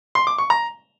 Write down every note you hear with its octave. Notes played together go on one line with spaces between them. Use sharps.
C6
D6
C#6
A#5